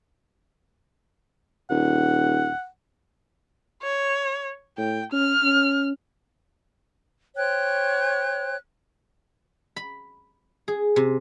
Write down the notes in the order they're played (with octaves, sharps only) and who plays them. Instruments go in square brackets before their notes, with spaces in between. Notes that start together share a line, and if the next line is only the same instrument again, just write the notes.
[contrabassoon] D#1 [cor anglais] F#5
[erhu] C#5
[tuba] A2 [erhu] G5
[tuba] C#4 [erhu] F6
[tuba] C#4
[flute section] C5 C#5 G5 F#6
[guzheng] B5
G#4
C3